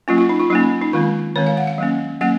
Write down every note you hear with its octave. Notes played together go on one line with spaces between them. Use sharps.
F#3 A#3 C#4 F4
F4
D#4
F4
F#3 A#3 C#4 D#4
D#4
D#3 G#3 C4 F4
D#3 G#3 C4 C#5
F5
F#5
F5
F#3 A#3 C#4
F#3 A#3 C#4 F#5